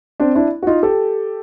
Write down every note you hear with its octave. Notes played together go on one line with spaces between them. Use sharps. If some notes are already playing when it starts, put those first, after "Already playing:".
C4 D4
D4 E4
F#4
D#4 F4
G4 A4